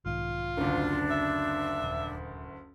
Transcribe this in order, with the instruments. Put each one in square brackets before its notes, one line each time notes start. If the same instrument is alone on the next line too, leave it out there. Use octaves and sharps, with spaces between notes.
[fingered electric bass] B1 G#2 D#3 [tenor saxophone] F4
[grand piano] F#1 D2 [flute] D4
[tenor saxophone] E5
[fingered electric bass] D#1